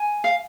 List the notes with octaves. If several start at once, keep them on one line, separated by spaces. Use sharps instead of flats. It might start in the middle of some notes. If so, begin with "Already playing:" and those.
Already playing: G#5
F5